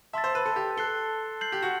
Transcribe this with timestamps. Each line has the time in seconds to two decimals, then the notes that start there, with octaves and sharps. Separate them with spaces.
0.13 E5 A5 C6 E6 A6
0.24 C5
0.35 B4
0.46 A4
0.56 G4
0.77 A4 F#6 C7 G7
1.41 G6 C7 F#7
1.52 G4
1.62 F#4